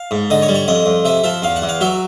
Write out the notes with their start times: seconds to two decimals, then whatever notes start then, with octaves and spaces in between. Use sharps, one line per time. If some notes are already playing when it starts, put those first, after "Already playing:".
Already playing: F5
0.11 G#2
0.30 D3 D#5
0.42 C#5
0.48 G3
0.55 C#5
0.68 F2 D#5
0.86 F2
1.05 C3 E5
1.24 F3 E5
1.42 E2 F5
1.56 F#5
1.62 E2
1.69 F5
1.81 F#3 E5